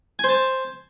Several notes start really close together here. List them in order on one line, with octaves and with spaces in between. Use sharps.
G#5 C5 A5